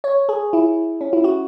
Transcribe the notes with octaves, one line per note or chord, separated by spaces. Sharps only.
C#5
G#4
E4
C#4
E4
F#4